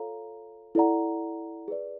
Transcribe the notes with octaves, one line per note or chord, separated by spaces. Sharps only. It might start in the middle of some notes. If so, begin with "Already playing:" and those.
Already playing: F4 A4 C#5 F5 A#5
E4 A4 D5 F#5 A#5
G#4 B4 D5